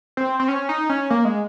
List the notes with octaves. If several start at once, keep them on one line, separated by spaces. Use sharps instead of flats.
C4
C4
C#4
D#4
C#4
A#3
G#3